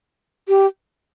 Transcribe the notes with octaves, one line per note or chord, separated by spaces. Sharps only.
G4